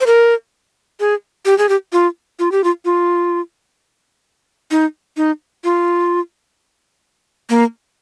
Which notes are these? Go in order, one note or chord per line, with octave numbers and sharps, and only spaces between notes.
C5
A#4
G#4
G4
G#4
G4
F4
F4
G4
F4
F4
D#4
D#4
F4
A#3